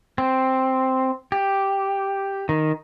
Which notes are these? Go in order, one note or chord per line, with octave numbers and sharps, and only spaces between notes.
C4
G4
D#3